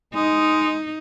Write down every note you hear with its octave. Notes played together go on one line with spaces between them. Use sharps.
G#3 D#4